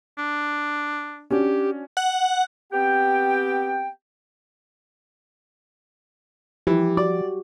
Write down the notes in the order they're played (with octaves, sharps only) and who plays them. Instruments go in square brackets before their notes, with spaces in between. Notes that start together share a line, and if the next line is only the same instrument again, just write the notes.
[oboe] D4
[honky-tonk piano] C#4 D4 F#4 [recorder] G4
[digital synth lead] F#5
[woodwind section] B3 C4 G4 G5
[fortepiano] E3 [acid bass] F3 [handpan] G4
[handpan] F#4 [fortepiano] D5